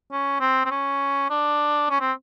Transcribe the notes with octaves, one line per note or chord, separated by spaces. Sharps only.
C#4
C4
C4
C#4
D4
C#4
C4